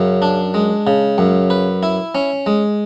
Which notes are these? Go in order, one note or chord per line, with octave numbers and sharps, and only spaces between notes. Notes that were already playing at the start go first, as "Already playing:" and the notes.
Already playing: F#2 C#3
D4
G#3
C#3
F#2
B4
E4
C#4
G#3